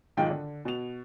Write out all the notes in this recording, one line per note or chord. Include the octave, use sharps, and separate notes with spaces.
B1 G#2 D#3 F4 G5
D3
B2 F7